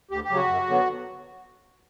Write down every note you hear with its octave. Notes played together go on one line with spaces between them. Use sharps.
D2 G4
G4
C#3 F#3
F#4
F#2
D3 F#3 B3